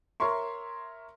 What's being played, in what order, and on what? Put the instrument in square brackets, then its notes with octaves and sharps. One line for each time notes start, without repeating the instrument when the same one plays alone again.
[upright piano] A#4 C#5 E5 C6 C#6